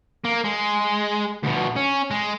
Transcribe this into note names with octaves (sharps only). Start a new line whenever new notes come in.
A#3
G#3
D2 B2
C#4
G#3